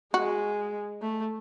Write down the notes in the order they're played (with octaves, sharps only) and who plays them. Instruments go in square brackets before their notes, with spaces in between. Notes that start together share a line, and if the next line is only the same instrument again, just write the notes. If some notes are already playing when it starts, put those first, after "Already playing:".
[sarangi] G#3 [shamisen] F#4
[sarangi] A3